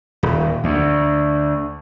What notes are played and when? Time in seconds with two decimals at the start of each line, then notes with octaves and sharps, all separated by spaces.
0.23 D#1
0.64 D2